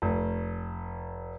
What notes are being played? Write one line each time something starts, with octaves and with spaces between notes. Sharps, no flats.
F1